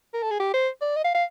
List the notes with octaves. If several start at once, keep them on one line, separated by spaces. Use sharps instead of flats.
A#4
A4
G#4
G4
C5
D5
D#5
F5
F5